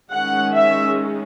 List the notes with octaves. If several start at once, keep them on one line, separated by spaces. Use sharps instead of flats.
D#3 G#3 C#4 F#5
E5